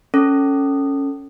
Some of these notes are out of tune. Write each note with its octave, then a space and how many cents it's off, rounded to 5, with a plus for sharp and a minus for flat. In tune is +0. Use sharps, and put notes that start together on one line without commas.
C#4 +0 A4 +15